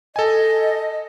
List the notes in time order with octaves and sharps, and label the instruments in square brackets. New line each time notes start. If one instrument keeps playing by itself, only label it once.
[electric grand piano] A4 G#5 [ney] D#5